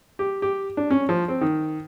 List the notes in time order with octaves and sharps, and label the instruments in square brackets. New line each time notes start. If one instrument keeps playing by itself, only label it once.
[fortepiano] G4
G4
D4
C#4
F3
C4
D#3